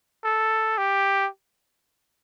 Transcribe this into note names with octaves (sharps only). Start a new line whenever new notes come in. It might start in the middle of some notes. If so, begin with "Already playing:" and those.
A4
G4